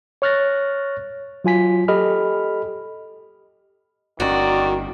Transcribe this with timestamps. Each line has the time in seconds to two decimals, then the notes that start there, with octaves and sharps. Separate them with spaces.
0.22 C#5 C#6 F6 F#6 A6 A#6
1.44 F#3 F4 G#5 B6
1.88 G4 A4 D#5 B5 F6
4.20 G1 D3 D#3 C#4 F#4 D5